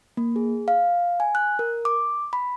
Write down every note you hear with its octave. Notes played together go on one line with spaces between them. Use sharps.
A#3
G#4
F5
G#5
F#6
A#4
D6
B5